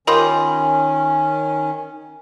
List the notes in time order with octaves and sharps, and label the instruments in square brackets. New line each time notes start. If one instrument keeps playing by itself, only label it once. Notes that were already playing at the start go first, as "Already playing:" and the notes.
[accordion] D#3 C#4 [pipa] F4 G4 D#5 [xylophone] A#4 B5 F#7